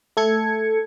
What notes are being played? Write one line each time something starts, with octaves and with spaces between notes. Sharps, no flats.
A3 A4 G#6 C#7